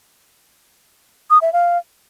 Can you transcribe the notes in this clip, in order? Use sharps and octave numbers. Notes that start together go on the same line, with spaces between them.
D#6
E5
F5